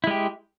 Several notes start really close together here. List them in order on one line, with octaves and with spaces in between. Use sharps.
E4 G#3 G4